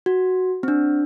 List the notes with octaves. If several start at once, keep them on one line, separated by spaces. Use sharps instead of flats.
F#4
C4
D4